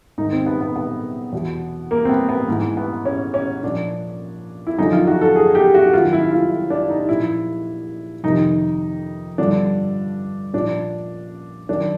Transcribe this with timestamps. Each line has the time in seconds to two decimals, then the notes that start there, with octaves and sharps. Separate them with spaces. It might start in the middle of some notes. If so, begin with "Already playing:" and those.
0.18 G#2 D#3 D#4
0.33 C4
0.46 B3
0.61 B3
0.76 B3
1.33 E2 B2
1.91 A#3
2.05 C4
2.09 B3
2.29 B3
2.48 G#2 E3
2.77 B3
3.05 C#4
3.34 C#4
3.63 A#2 F3 D4
4.67 E4
4.78 F#2 D3 F3 D#4
4.93 F4
5.07 F#4
5.21 A4
5.36 G#4
5.55 G4
5.75 F#4
5.93 F#2 D#3 F4
6.13 E4
6.31 F4
6.70 D4
6.90 D#4
7.09 A#2 F3 E4
8.24 F2 C3 D#3 D#4
9.38 G2 D3 F3 D4
10.53 A#2 F3 D4
11.69 F#2 D#3 D4